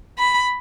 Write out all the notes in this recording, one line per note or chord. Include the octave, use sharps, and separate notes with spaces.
B5